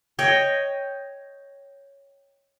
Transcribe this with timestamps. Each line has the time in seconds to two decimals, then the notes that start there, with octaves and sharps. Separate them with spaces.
0.19 C#5 D#5 G5